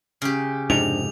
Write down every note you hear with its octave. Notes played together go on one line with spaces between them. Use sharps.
C#3 G4
F2 G#2 C3 D4 F7